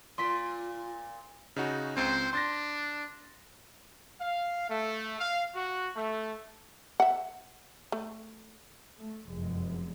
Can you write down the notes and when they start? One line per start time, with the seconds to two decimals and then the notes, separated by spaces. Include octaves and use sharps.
0.18 A#2 F4 C6 B6
1.56 C#3 D#4 F#4
1.97 C#2 C4 C5
2.33 D4 C6 A6 A#6
4.20 F5
4.69 A3
5.19 F5
5.55 F#4
5.96 A3
7.00 E5 F#5
7.92 A3
9.00 A3
9.29 F1 F#2 G#3